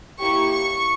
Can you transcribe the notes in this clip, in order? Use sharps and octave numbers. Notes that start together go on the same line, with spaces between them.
A#3 E4 G4 C#6
C#6